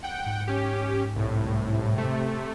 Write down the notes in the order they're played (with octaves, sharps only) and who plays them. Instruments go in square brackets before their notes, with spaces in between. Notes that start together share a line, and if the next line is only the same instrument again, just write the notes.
[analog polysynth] F#5 G5
[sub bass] G#2
[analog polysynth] C#4 G4
C2 A2
C3 A3